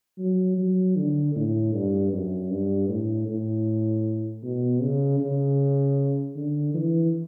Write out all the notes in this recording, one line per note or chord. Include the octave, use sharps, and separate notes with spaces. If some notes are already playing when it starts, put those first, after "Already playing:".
F#3
F#3
D3
A2
G2
F#2
G2
A2
A2
B2
C#3
C#3
D3
E3